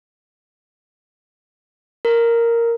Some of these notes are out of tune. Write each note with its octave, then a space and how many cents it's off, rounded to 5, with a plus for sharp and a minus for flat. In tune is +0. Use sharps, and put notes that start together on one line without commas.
A#4 -5